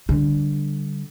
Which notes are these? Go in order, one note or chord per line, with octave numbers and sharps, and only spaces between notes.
D3 G3